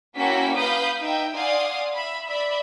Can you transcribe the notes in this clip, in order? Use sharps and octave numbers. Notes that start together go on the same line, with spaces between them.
A#3 C#4 E4 F#4 G5 B6
B4 F5 B5 D#6 G6
D#4 E5 G5
D5 F5 F#5 G#5 C6 D#6
E5 B5
D5 E5 B5